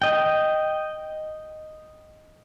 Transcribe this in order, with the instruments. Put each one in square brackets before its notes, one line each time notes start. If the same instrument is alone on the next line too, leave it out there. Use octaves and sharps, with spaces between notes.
[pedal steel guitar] D#5 G5